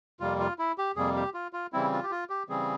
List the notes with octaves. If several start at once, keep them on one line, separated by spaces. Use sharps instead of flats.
F2 C3 G3 A#3 F4
F4
E4
G4
F2 C3 G3 A#3 G#4
G4
F4
F4
C#3 E3 G3 C4 E4
F4
G4
F4
G4
C#3 E3 G3 C4 G#4